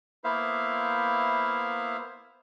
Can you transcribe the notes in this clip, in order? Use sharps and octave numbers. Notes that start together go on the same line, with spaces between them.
A#3 B3 E4 C5 E5 F5